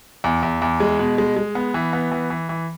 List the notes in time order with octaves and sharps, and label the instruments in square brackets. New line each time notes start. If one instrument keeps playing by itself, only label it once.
[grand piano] E2
E2
E2
G#3
B2
G#3
G#3
B3
E3
B3
E3
E3
E3